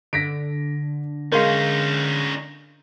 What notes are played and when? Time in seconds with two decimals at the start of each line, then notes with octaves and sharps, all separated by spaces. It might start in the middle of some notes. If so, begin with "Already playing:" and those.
0.13 D3 A#6 B6 D7
1.32 G#3 C#4 D#4 A#4 F5 C6 G6